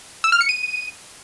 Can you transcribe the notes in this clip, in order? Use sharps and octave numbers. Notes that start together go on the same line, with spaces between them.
E6
F6
C#7
D#7